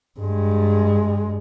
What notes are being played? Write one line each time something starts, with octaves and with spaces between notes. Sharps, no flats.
G2 G#3